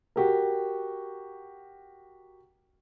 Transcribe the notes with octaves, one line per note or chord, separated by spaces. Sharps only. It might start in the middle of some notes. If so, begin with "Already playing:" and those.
F#4 G4 A#4